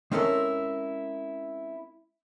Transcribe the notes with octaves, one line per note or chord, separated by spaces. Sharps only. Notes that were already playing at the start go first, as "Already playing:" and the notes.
G#3 C4 C#4 E4 A4 A#4